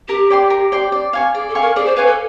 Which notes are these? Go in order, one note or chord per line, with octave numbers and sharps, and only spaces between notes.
G4 A#4
D5 G5 C6
A#4
D5 G5 C6
D5
F5 G#5 C#6
G#4 D5
A4
F5 G#5 C#6
A#4
G#4 D5
C5
B4 F5 G#5 C#6
A4